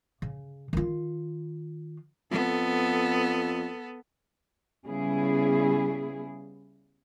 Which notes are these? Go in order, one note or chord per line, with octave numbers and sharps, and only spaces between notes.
C#3
D#3 F4
F2 B3 A4
C#3 G3 B3 E4 G#4